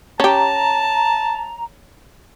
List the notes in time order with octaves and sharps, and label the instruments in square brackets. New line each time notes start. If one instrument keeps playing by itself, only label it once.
[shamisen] C#4 G4 [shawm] A5 [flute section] A#5